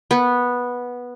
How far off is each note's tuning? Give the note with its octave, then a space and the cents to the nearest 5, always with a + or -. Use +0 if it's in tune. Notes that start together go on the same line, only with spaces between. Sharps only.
B3 -10